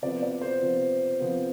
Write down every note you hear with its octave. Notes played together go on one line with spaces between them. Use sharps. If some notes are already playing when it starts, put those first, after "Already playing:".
C3 F3 B3 D5
D5
C5
C3 F3 B3
C3 F3 B3